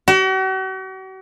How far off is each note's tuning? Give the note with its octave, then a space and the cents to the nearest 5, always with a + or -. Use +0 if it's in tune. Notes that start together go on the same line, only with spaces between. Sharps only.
F#4 +45